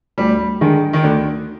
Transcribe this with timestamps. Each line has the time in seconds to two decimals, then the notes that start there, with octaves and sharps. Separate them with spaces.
0.18 D2 G3
0.61 D3 D#3 G#3 D4 G#4
0.93 D#3
1.03 D2 D3